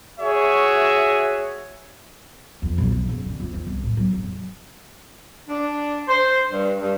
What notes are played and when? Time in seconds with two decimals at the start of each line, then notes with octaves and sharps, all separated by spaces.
0.19 F#4 G#4 C#5 E5
2.62 F2
2.78 B1
2.92 B1
3.09 F#1
3.26 D3
3.40 F2
3.53 D#3
3.67 C2
3.84 A2
3.97 F#3
4.13 F1
5.48 D4
6.07 C5
6.52 G2
6.80 G2